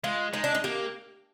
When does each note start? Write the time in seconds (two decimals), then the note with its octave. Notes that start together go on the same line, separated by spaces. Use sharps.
0.04 G#3 F4
0.34 G#3 D#4
0.44 D4
0.55 D#4
0.64 A#3 G4